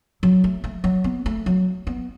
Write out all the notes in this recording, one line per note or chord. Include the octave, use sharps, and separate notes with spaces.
F#3
A3
A3
F#3
B3
A3
F#3
B3